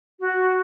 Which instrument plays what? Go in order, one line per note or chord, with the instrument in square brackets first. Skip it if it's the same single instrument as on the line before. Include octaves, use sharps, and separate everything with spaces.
[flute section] F#4